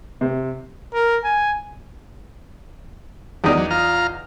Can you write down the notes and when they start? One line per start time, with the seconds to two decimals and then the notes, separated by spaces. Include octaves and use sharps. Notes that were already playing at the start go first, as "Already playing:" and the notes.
0.21 C3
0.94 A#4
1.24 G#5
3.44 E2 D#3 G3 D#4 D5
3.57 F#3
3.71 F4 A#5 F6